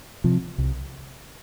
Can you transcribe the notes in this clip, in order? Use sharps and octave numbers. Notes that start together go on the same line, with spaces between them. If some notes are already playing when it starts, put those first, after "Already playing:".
C3 F3
C2